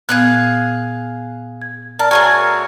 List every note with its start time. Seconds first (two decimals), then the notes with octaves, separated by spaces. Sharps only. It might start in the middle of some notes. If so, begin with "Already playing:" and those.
0.09 A#2 B3 G#4 F5 F#6
1.62 G#6
1.99 A#4 D5 A5
2.11 A3 F#4 G#4 A#4 C#5 G#5